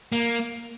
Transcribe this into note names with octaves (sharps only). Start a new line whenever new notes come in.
A#3